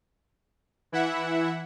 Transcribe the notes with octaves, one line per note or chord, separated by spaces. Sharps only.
E3 E4 E5 F#5